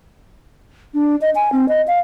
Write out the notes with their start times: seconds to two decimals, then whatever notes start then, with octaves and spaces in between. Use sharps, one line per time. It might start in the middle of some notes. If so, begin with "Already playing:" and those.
0.94 D4
1.21 D#5
1.35 G#5
1.52 C4
1.69 D#5
1.87 F5